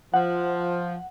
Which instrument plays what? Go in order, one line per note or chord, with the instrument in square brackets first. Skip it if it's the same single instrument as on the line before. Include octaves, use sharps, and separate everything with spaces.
[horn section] F3 [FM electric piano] F#5